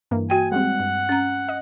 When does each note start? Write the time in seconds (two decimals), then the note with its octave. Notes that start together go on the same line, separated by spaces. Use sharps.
0.11 G2 E3 A#3
0.30 F#4 G5 G#5
0.52 G3 G#3 C4 F#5
0.80 G2
1.09 C#4 A#5
1.49 D#5